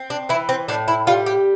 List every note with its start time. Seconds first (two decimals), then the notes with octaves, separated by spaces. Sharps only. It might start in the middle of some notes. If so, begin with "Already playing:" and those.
Already playing: C4
0.10 D4
0.29 E3 E4
0.49 C4
0.68 A2 D4
0.88 E4
1.07 G3 F4
1.26 G4